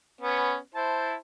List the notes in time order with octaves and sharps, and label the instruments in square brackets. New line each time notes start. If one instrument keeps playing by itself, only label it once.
[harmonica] B3 C#4
E4 C5 A5